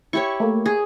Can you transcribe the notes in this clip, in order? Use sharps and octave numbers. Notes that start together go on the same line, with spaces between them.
E4 G4 C#5 C#6
A3 A#3
G#4